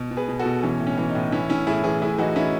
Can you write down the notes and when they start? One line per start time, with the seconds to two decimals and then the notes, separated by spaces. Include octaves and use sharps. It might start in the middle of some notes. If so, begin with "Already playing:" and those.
Already playing: B2
0.11 B2
0.17 G#4 B4
0.29 B2
0.39 F#4 A4
0.46 B2
0.63 E3 C#4
0.80 A2
0.87 C#4
0.98 E3
1.09 D#4
1.15 A2
1.32 E3 C#4 E4
1.49 A2 C#4 E4
1.67 A2 E4 G#4
1.84 E3 E4 G#4
2.02 A2 E4 G#4
2.18 E3 D#4 F#4
2.36 E3 C#4 E4